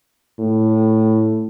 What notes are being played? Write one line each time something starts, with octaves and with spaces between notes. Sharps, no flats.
A2